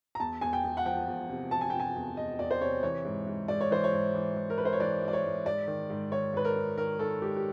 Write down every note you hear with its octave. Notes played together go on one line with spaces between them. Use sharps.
A#5
E2 A5
E2 G#5
G5
E2
F#5
F3 G5
E2
C3
F3 A5
G#5
C3 G5
G#5
E2
E2 D#5
E2 D5
C5
C3 C#5
E3 C#5
G#2
G#2
G#2 D5
C#5
E3 C5
C#5
G#2
E3
E3
A#4
G#2 B4
C5
C#5
E3 D5
G#2
D5
C#5
G#2
G#2 D5
D#3
G#2
D#3 C#5
G#2 B4
A#4
G#2
D#3 A#4
D#3 A4
G#2 G4
G4